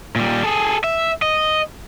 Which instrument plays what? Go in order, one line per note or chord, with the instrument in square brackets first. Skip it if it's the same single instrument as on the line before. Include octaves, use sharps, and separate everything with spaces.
[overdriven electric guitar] A#2 G3
G#4 A4
E5
D#5